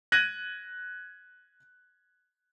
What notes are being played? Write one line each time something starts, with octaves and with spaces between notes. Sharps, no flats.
F#6 G#6 A#6 D#7 F#7